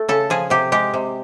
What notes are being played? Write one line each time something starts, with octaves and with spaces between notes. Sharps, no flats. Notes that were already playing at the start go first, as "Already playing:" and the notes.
Already playing: A3
C#3 A4
F3 G#4
C3 G4
G#3 G4
C3